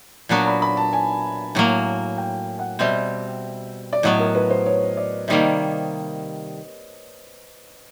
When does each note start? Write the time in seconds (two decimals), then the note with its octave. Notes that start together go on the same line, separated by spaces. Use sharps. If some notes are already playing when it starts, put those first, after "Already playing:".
0.29 A#2 F#3 B3 D4 F#4 A#5
0.47 B5
0.62 B5
0.77 A5
0.93 G#5
1.55 A2 F#3 A#3
2.18 G5
2.59 F#5
2.79 B2 G3 C4 E5
3.93 D5
4.03 A2 F#3 B3 D#5
4.19 A#4
4.35 B4
4.50 C5
4.66 C#5
4.97 D5
5.28 C3 D#3 G3 A#3 D#5